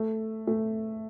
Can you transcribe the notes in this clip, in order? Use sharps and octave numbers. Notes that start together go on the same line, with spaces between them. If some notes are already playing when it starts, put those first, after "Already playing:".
Already playing: A3
A3